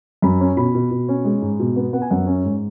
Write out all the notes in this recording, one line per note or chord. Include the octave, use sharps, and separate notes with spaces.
F#2 B5
C#4
B2 B5
B2
B2
C#4
G#3
G#2
B2
B3
B3 F#5
G#5
F#2 F#5
C#4
G#2